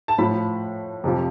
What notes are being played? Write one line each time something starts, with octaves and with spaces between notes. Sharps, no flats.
A5
A2 F3 B5
F2 C3 F3